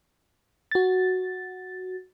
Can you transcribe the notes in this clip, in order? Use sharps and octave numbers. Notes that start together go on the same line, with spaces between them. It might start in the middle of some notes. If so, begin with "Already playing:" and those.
F#4 A6